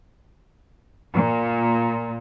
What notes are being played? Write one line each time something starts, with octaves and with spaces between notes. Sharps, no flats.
A#2